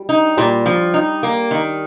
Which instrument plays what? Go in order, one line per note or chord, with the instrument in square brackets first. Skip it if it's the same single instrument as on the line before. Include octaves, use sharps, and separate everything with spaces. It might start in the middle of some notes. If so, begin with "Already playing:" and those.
Already playing: [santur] G3
[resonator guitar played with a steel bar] D#4
[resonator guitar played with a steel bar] A#2 [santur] G3
[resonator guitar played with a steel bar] F3
D#4
A#3
D#3